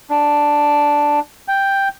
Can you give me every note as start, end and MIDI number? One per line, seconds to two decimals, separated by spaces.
0.10 1.20 62
1.48 1.88 79